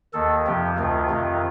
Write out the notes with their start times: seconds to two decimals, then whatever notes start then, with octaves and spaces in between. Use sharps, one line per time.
0.13 D#2 D#3 A4
0.46 F2 C3 F3 G4
0.78 D2 C3 D#3 F4
1.09 F2 C3 D#3